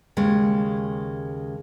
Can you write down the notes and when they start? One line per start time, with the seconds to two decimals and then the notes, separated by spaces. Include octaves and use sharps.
0.17 D#2 C#3 G#3